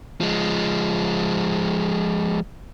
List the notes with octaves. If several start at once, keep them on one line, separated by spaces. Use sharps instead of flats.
F3 G#3